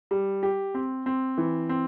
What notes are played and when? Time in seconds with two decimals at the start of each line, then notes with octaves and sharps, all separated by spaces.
0.11 G3
0.43 G4
0.75 C4
1.06 C4
1.38 E3
1.69 C4